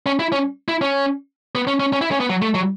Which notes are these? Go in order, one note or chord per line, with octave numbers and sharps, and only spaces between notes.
C#4
E4
C#4
E4
C#4
B3
C#4
C#4
C#4
E4
C#4
B3
F#3
A3
F#3